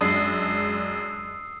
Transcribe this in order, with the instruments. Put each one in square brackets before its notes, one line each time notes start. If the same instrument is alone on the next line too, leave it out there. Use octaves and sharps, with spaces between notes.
[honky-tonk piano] F#2 G#3 D4 [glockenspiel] D#6 E6 C7